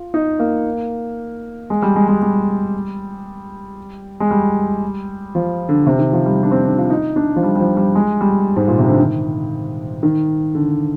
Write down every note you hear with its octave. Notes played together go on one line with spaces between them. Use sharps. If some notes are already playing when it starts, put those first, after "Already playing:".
Already playing: F4
D#4
A#3
G#3
G3
G#3
G#3
G3
G#3
G3
F3
D3
C3
D#3
F3
G3
D4
C4
D4
F4
D#4
D4
F3
G3
G3
F3
G3
G#3
G3
G#2
A#2
C3
D3
D#3
D#3
D3